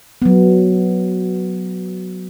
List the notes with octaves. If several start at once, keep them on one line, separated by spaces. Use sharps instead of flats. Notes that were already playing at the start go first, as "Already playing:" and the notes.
F#3 B3